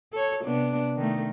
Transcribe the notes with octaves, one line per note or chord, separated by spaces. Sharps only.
A4 C#5
C3 B3 D4
D#3 A3